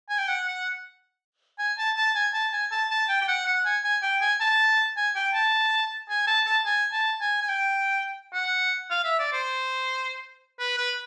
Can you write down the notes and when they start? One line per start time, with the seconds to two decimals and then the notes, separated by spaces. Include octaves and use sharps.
0.09 G#5
0.19 G5
0.28 F#5
0.47 F#5
1.59 G#5
1.78 A5
1.97 A5
2.15 G#5
2.33 A5
2.53 G#5
2.71 A5
2.90 A5
3.09 G5
3.22 G5
3.28 F#5
3.46 F#5
3.65 G#5
3.84 G#5
4.02 G5
4.21 G#5
4.40 A5
4.97 G#5
5.15 G5
5.34 A5
6.10 G#5
6.27 A5
6.46 A5
6.66 G#5
6.93 A5
7.21 G#5
7.42 G#5
7.49 G5
8.34 F#5
8.91 F5
9.04 E5
9.19 D5
9.33 C5
10.59 B4
10.77 B4